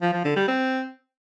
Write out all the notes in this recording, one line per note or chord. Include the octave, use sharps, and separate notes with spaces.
F3
F3
D3
G3
C4